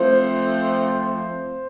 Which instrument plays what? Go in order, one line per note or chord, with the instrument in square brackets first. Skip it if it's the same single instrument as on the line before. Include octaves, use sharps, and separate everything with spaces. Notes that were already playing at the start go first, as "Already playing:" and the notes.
Already playing: [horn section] F3 A3 C4 F4 [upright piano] C5